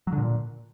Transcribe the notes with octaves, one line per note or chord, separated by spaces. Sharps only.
F#3
D3
A#2